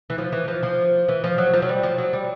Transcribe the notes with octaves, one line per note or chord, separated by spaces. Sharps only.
E3
F3
E3
F3
F3
E3
F3
F#3
F3
F#3
G3
F3
F#3
G3